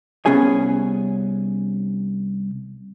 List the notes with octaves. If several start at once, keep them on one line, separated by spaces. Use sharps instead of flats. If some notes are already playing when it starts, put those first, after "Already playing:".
C2 B3 C#4 G#4 G#5